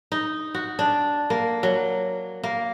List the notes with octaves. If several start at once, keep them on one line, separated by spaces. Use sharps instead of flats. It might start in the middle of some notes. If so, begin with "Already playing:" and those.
D#4
F#4
D4
A#3
F#3
A#3